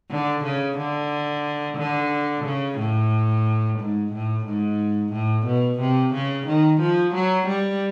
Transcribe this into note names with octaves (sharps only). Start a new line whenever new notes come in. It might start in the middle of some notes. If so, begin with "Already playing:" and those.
D3
C#3
D3
D3
C#3
A2
G#2
A2
G#2
A2
B2
C3
C#3
D#3
F3
F#3
G3